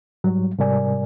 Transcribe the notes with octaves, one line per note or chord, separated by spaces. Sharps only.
G#2 F#3 G3
G#2 C3 G3 A#4 D5 G#5